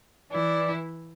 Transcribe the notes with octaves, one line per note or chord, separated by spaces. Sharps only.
E3 E4 D5